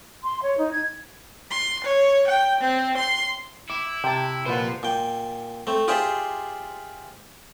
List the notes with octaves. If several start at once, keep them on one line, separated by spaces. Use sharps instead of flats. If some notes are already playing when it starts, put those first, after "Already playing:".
C6
C#5
D#4
G#6
C6
C#5
G5
C4
C6
E4 D6
C3 G5 A5
A#2 F4 B4 C5 F#5
A#2 G5
A3 C4
F4 G4 G#4 C5 D5 E5